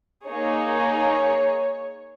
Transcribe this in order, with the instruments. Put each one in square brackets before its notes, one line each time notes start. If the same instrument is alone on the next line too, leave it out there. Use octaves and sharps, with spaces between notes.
[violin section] A#3 D#4 G#4 C#5